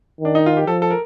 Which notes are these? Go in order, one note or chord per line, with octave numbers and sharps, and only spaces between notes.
D#3 D4
D#4
F4
G4
F3 A4
A4
A#4